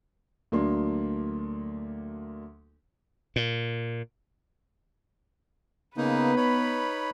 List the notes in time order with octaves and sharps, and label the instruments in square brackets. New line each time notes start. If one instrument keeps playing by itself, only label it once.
[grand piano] D2 F#3 A#3 D4 C6
[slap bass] A#2
[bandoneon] C#3 A#3 D#4 [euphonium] B3 [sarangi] B4
[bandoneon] D#4 C#5 B5